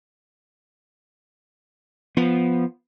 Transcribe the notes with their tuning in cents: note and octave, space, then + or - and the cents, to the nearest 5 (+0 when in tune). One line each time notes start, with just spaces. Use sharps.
F3 +0 B3 +0